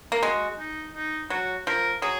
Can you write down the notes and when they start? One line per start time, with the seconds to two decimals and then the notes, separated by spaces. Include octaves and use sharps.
0.12 A#3
0.23 G#3 F#4
0.59 D#4
0.95 D#4
1.30 F#3 F#4
1.67 F3 A#4
2.02 F#3 G#4